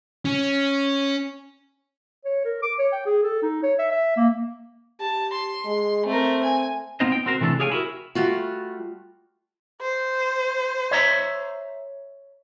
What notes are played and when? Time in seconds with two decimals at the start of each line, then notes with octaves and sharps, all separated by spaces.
0.25 C#4
2.25 C#5
2.45 A#4
2.63 D6
2.79 C#5
2.93 G5
3.06 G#4
3.23 A4
3.43 D#4
3.63 C#5
3.79 E5
3.91 E5
4.17 A#3
5.00 G4 A5
5.33 C6
5.65 G#3
6.06 A3 C4 A#4
6.43 G#5
7.00 B3 C4 D#4 F4 C5 D#5
7.12 G5
7.26 C4 F#4 A#4 C5
7.41 C3 E3 A3 B3 D4 A4
7.60 G4 G#4 C#5 F5 G5 G#5
7.71 E4 F#4 A#4
8.15 G3 A3 F4 F#4
9.81 C5
10.91 C#5 E5 A#5